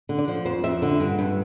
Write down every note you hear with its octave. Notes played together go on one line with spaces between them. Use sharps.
D3
D5
F3
F2 C5
F2 E5
D3 E5
G2
G2